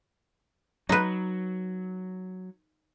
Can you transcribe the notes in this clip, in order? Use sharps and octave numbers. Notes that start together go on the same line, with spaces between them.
F#3 D#4 B4